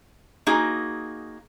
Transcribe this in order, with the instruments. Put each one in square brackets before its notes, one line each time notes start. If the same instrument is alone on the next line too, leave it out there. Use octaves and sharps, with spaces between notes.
[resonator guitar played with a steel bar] A#3 D#4 F#4 G#4